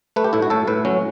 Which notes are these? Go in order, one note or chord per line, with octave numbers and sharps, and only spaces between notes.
A3 B4
G4
A2 E4
F#4
A2 A4
A2 B4
F#3 C#4